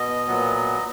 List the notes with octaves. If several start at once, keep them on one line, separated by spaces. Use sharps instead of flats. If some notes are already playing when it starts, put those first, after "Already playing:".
Already playing: B2 D#5
A#2 F#3 B3